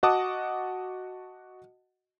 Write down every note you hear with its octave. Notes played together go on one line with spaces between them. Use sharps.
F#4 D#5 F#5 A5 D6 D#6